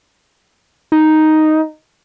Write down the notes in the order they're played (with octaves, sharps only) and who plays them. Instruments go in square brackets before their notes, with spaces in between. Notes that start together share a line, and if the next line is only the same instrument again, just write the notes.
[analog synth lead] D#4